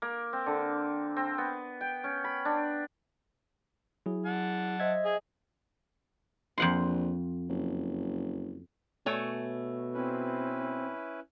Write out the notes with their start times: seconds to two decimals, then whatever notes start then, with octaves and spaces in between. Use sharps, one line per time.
0.02 A#3
0.33 C4
0.46 D3
1.16 C4
1.38 B3
1.81 G5
2.04 C#4
2.24 B5
2.45 D4
4.06 F#3 E4 G#4
4.25 F#5 A5
4.80 C5 D#5 E5 G#6
5.05 G#4
6.58 A#1 F2 F#5 C6
7.49 F#1
9.06 B2 A3 C#5 G#5
9.94 C4 C#4 E4 B4